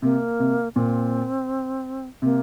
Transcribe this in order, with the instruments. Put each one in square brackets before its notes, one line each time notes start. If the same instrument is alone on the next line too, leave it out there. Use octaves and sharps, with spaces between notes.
[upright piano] C3 [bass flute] A#3
[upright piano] C3
[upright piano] A#2 [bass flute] C4
[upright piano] C3 [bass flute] A#3